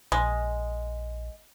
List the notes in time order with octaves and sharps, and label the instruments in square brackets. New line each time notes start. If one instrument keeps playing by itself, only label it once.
[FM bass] A#1 [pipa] G#3